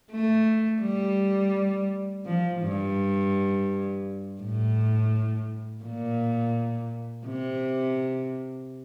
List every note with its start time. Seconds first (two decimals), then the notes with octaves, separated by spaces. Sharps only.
0.11 A3
0.82 G3
2.26 F3
2.62 G2
4.41 A2
5.84 A#2
7.27 C3